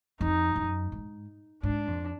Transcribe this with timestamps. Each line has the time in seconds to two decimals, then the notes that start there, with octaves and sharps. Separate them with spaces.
0.20 F2 D#4
0.56 F#2
0.92 G#2
1.63 G#2 D4
1.87 F2